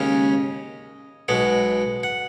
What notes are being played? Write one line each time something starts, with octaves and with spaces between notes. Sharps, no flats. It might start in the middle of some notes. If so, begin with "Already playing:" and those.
Already playing: D#2 C#3 G#3 C#4 D#5
B1 B2 G#3 F#5
F#5